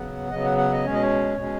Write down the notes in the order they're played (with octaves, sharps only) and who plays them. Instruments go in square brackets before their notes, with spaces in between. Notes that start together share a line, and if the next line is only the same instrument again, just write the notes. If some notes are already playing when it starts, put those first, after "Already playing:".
Already playing: [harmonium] C#3 F#3 B3 F#5
C#3 F#3 B3 D#5
F#5
F#5
D#5
B2 G#3 C#4 C#5
D#5
C#5
B2 G#3 C#4